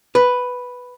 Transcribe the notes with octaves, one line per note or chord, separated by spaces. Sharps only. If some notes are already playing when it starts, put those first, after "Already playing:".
B4